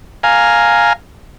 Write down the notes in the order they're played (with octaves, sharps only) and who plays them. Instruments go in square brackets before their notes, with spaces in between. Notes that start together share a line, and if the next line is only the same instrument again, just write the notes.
[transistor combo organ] F5 G#5 A#5